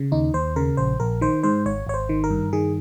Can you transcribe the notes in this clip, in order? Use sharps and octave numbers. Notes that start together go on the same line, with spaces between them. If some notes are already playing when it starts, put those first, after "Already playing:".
Already playing: C#3
D#2 D#4
D#2 C5
C#3 A#4
A#1 C5
A#1 A#4
D#3 C5
G#2 C5
G#1 C#5
G#1 C#5
C5
D#3
A#4
G2
D#3 G#4